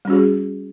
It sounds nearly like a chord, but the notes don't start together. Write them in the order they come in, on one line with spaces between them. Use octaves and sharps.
G3 C#4 F#4 G#4